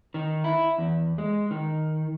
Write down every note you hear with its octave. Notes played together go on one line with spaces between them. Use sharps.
D#3
E4
E2
G#3
D#3